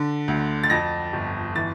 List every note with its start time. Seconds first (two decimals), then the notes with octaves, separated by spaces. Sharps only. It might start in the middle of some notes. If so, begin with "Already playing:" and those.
Already playing: D3
0.28 D2
0.63 A6
0.70 F2 A#6
1.13 G1
1.55 E3 A6